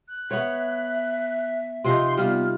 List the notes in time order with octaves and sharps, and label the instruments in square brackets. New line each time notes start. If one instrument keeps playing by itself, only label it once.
[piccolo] F#6
[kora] B3 C#5 [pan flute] E5
[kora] C3 F3 D#4 [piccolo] C6
[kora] G3 F4 [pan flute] B3 [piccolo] F6